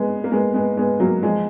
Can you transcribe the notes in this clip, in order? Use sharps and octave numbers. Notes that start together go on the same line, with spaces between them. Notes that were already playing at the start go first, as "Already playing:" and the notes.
Already playing: G#3 B3
A#3
G#3 B3
G#3 B3
G#3 B3
F#3 A#3
F3 G#3